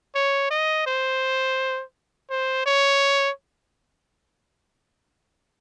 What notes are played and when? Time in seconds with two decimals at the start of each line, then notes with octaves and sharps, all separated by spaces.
0.15 C#5
0.51 D#5
0.87 C5
2.30 C5
2.66 C#5